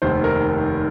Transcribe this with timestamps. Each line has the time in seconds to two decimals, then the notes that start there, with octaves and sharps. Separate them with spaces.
0.02 F1 D#2 D#3 C5
0.24 A#4